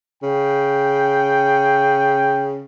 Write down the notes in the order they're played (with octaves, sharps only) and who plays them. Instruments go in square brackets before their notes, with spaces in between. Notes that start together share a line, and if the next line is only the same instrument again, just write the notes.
[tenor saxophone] C#3 [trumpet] G5